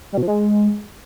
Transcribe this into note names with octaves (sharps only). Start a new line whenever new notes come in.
G3
B2
F3
G#3